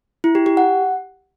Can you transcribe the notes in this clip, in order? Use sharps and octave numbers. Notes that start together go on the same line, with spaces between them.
E4
G4
G4
F#5